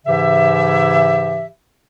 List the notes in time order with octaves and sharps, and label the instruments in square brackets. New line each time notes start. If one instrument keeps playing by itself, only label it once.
[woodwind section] G#2 C#3 E3 G4 E5